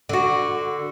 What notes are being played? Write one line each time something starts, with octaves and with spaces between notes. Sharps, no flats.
D3 F#4